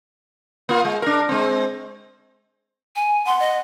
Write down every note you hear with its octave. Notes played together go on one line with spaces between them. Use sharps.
A#3 F4
G#3
D4 A#4
G#3 C4
G#5
F#5 C6
D#5